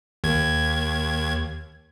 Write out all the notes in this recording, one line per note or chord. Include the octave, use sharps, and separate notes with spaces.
D#2 G#6